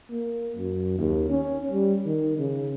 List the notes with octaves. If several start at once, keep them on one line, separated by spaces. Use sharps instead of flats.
A#3
F#2
D#2
C#4
G3
D#3
C#3